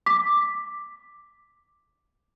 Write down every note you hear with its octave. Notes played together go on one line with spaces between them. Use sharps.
D6 B6